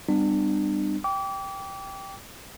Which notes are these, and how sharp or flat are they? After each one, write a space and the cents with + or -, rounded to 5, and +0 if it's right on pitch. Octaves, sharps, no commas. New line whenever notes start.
G3 +15 B3 +45 D4 +40
G5 +0 D6 -30